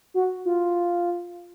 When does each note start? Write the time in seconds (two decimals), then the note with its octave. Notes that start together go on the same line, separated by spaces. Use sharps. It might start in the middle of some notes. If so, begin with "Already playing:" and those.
0.14 F#4
0.45 F4